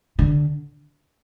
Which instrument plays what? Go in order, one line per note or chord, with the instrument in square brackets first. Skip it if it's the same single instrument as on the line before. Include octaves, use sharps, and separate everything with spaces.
[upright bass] D3